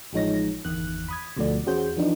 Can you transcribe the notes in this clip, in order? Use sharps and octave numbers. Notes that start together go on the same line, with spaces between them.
A1 F3 G#3 D#4 C#5 A#6
G1 E2 D#3 F#6
B5 D#6 G#6
D2 B2 F3 A3 F#4 D5
E2 C#4 F#4 G#4 C5 G6
E3 F3 B3 D4 D#4